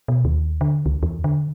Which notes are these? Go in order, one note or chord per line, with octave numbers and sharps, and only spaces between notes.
B2
D#2
D3
C#2
E2
D3